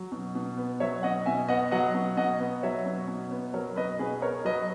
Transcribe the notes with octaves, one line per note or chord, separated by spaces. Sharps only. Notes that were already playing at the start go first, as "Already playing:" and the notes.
Already playing: F#3
B2
B2
B3
F#3 C#5 E5
B2 D#5 F#5
B2 E5 G#5
B3 D#5 F#5
F#3 D#5 F#5
B2
B2 D#5 F#5
B3
F#3 C#5 E5
B2
B2
B3
F#3 A#4 C#5
B2 B4 D#5
B2 G#4 B4
B3 A#4 C#5
F#3 B4 D#5